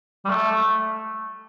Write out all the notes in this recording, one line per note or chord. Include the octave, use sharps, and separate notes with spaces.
G3
A3